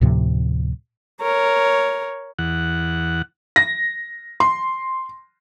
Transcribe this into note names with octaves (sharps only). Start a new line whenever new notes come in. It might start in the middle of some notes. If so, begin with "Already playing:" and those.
D2 A2 C3 F3
A#4 C#5
E2 F#5
A#6
C6